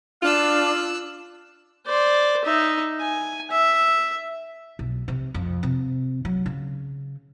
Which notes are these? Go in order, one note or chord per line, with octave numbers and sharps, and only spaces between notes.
D4 F4 F5 E6 F#6
C5 D5
D#4 E5
G#5
E5
B1
C3
F2
C3
F#3
C#3